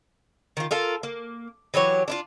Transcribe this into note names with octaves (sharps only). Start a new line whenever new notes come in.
D#3 F4
F4 A4 A#4
A#3
E3 F#3 G4 C#5
D4 E4 F4